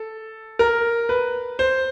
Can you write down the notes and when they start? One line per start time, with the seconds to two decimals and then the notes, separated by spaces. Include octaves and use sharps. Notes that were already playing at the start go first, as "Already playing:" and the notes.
Already playing: A4
0.59 A#4
1.09 B4
1.59 C5